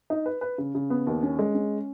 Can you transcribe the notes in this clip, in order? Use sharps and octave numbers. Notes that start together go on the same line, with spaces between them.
D#4
B4
B4
C#3
C#3
B3
D#2
C#4
G#3
C#4